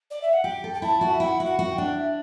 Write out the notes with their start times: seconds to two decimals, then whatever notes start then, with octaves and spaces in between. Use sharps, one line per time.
0.10 D5
0.22 E5
0.33 F#5
0.44 G4 G5
0.64 A4
0.74 G5
0.82 E4 A5
1.01 F#4
1.10 E5
1.20 E4 G5
1.24 F#5
1.40 F#4
1.46 F#5
1.59 F#4
1.71 G5
1.78 D4
1.97 E5